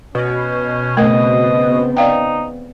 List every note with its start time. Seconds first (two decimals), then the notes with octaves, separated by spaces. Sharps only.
0.15 B2 C#4
0.97 C#3 A3 B3 C4 A#4 D#5 F#5
1.97 D#4 D5 F5 G5